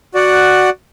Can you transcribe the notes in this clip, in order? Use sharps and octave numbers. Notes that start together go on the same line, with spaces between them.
F#4 D5 F#5